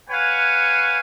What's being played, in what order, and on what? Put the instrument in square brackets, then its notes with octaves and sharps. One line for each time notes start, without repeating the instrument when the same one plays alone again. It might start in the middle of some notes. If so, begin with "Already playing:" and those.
[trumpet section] B4 C#5 F5 F#5 G#5